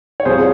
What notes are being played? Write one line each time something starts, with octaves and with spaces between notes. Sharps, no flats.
C#5
C2 C3 F3 G#4 C5